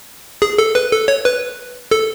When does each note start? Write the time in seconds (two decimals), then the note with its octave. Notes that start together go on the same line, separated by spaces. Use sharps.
0.42 G#4
0.58 A4
0.75 B4
0.92 A4
1.08 C#5
1.25 B4
1.91 A4